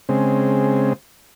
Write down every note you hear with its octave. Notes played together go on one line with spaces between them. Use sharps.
C#3 G#3 C4